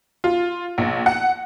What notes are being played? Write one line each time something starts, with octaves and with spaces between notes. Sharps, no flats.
F4
A#1
F#5